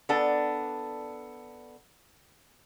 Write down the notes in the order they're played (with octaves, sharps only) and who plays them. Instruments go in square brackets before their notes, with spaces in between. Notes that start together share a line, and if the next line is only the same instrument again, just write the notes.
[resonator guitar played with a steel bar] B3 D4 A4